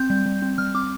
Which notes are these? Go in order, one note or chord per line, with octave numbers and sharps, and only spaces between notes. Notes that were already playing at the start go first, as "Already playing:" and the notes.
Already playing: C4 G6
G3
G3
C4
G3 F6
C4 D6